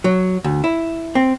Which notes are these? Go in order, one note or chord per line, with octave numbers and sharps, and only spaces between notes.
F#3
D2
E4
C4